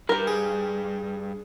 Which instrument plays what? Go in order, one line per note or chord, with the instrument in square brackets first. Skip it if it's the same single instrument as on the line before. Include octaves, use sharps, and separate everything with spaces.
[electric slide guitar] G2 B4 [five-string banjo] G4 A#4
[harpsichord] G#4